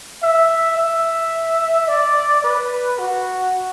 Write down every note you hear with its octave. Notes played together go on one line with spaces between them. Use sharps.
E5
E5
D5
B4
F#4